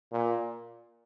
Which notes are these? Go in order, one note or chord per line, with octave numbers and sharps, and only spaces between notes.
A#2